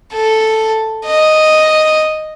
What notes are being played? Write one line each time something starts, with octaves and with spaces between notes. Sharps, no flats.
A4
D#5